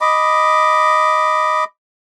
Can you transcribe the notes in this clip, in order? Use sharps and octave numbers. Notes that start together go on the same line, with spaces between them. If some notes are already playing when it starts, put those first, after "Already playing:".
D#5 B5 D6